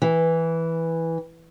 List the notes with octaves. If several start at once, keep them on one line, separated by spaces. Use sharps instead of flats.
E3